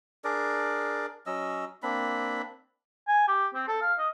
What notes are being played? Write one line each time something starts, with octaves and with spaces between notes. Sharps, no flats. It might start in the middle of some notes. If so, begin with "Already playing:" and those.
D4 G#4 A#4 D5
F#3 C#4 D#5 E6
A#3 C4 D4 B5
G#5
G4
C4
A4
F5
D#5